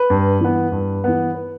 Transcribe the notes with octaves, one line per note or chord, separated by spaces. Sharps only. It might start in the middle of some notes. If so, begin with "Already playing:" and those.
Already playing: B4
G2
E3 B3
G2
E3 B3
B4